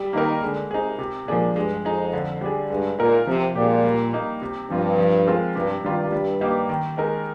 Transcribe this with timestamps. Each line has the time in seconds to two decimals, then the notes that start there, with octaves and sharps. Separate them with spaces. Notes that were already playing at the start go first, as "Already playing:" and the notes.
Already playing: G3
0.13 D#3 A#3 D#4 A#4
0.42 D3 G#3
0.71 C3 D#4 G#4
0.99 C3
1.27 A#2 F3 G#3 D4 G#4
1.56 G2 G#3
1.84 F2 D#4 G#4
2.13 D3
2.41 G3 D4 G#4
2.70 G2 G#3
2.99 A#2 D#4 A#4
3.27 C3 F3
3.55 A#2 G#3 D4 G4
3.84 G3
4.13 A#3 D#4
4.42 C3
4.70 G2 F3 C4 F4
4.98 F3
5.26 G#3 C4 F4 A#4
5.55 G2 C3
5.83 G2 D#3 G3 D4 F4
6.12 G3
6.41 A#3 D#4 G4
6.69 D#3
6.97 G#3 D#4 A#4